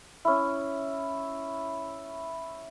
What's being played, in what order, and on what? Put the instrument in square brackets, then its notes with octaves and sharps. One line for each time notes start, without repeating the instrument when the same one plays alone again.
[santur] C#4 E4